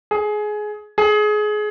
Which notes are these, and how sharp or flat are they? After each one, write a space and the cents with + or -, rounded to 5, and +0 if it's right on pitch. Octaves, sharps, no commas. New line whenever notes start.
G#4 +20
G#4 +25